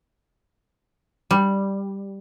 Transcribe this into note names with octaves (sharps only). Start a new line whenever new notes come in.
G3